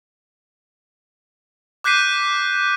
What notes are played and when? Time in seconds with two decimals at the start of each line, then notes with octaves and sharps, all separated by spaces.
1.84 D6 F#6 G6 B6 C7 D#7